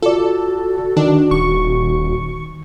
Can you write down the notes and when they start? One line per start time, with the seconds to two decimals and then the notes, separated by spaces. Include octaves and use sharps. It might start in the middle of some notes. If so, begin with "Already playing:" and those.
0.03 F4 F#4 A4 D5
0.97 D#3 D4
1.31 D#1 C#6